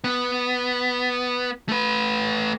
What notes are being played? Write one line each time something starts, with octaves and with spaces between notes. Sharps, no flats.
B3
A3 B4